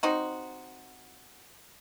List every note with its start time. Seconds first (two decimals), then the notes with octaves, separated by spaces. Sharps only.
0.03 C4 D#4 F#4